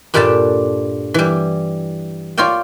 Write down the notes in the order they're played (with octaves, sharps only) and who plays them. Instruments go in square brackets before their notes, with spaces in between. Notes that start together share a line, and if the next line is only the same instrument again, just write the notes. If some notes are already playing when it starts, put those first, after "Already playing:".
[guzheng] G2 A#2 G3 D4 A4 A5
E3 G3
F4 C#5 D5 F5 G5